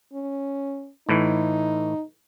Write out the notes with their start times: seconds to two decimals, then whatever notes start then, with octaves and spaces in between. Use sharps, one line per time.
0.14 C#4
1.09 A2 E3 D#4